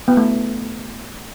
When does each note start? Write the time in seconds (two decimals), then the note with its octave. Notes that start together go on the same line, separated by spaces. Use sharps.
0.08 B3
0.17 A3